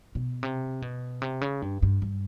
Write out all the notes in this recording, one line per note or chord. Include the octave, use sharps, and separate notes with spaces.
B2
C3
B2
C3
C#3
G2
G2
G2